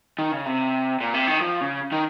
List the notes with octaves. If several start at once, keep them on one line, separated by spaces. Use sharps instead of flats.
D#3
C#3
C3
A#2
C3
D#3
F3
C#3
D#3